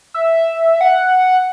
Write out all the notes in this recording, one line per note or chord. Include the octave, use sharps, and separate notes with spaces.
E5
F#5